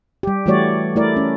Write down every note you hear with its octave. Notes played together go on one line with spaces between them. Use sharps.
G3 G4
E3 G3 A3 F#4 C#5 D5
A3 E4 A#4 D5
C#4